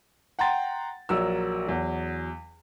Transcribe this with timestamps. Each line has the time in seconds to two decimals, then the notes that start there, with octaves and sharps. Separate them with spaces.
0.39 F#5 G5 A#5 C6 A6
1.09 A#1 F#3 A#4 E6
1.67 E2 F#3